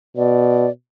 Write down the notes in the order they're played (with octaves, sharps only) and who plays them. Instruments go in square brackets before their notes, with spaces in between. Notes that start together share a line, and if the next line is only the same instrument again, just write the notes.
[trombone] B2 [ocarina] D5